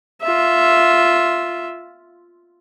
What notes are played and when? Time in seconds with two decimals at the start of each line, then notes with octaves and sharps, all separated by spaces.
0.22 F4 E5